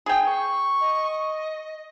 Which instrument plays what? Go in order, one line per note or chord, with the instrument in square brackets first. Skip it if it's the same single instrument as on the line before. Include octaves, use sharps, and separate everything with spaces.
[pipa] G#4 G5
[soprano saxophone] C#6
[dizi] D#5